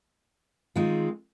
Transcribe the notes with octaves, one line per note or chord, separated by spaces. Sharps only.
D#3 G#3 C4 F4